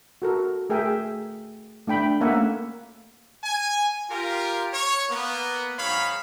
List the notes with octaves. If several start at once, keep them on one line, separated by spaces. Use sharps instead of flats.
F#4 A4 A#4
A3 G#4 A#4 E5 G5 G#5
A3 D4 G5 B5
A3 A#3 C#4 E5 F#5 G#5
G#5
F4 G4 A#4
C#5
A#3 B3
G#2 D#3 F#3 C#5 F5 B5